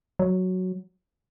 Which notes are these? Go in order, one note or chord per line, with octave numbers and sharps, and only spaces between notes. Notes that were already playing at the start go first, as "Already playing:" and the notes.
F#3